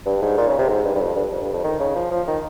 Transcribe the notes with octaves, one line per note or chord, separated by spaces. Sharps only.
G2
G#2
A#2
C#3
C3
G#2
G2
G2
F2
G2
F2
G2
F2
D#3
C#3
F3
F3
D#3